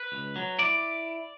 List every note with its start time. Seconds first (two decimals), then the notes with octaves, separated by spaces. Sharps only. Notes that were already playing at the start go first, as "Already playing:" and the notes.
Already playing: B4
0.12 C#2
0.36 F#3
0.59 E4 D5